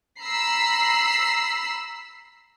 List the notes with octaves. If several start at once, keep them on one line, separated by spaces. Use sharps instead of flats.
A#5 B5 E6 C7